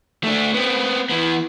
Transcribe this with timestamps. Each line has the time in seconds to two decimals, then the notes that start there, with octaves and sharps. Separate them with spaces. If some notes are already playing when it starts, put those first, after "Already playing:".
0.24 A3 D4
0.54 B3 C4
1.10 E3 B3